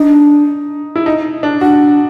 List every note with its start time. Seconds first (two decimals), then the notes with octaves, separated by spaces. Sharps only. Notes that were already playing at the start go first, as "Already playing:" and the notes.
Already playing: D4 D#4
0.96 E4
1.06 D#4
1.43 D4
1.61 D4 F#4